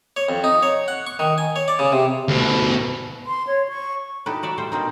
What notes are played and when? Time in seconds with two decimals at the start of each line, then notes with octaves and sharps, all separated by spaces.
0.17 C#5
0.29 F2
0.44 D#4
0.63 C#5
0.88 F#5
1.07 C#6
1.19 D#3
1.38 G#5
1.56 C#5
1.68 D5
1.79 C#3
1.92 C3
2.28 D2 B2
3.26 C6
3.47 C#5
3.69 C#6
4.26 D#4 E4 F#4 G4 A4 B4
4.43 F#4 D5 E5
4.58 G3 A3 C5 G5
4.72 B2 A#3 C4 D#4